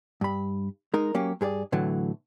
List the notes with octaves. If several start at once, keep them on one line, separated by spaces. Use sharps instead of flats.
G2 B5
G#3 D#4 A#4
F#3 A#3 C#4 G4
G2 G#4 A#4 D5
A2 D3 E3 F#3 A3